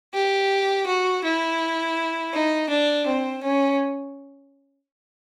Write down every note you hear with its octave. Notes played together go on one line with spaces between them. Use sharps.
G4
F#4
E4
D#4
D4
C4
C#4